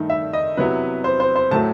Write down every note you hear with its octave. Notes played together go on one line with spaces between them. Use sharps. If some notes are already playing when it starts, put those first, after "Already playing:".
Already playing: G2 D#3 A3 D#4
E5
D#5
C3 F#3 B3 E4 B4
C5
C5
C5
A2 F#3 A3 A5